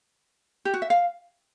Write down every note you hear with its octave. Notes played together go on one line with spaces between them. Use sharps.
G4
F#4
E5
F5